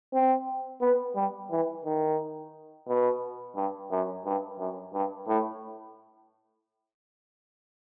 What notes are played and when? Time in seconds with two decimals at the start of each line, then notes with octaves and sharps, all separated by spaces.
0.14 C4
0.81 B3
1.16 G3
1.51 E3
1.85 D#3
2.88 B2
3.56 G2
3.91 F#2
4.25 G2
4.59 F#2
4.93 G2
5.27 A2